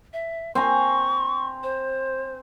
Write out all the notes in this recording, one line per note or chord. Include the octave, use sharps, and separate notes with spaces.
E5
C4 G#5 A#5 C#6
C5